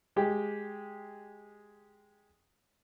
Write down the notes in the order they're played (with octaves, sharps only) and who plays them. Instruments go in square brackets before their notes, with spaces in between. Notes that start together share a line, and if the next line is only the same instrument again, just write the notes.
[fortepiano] G#3 G4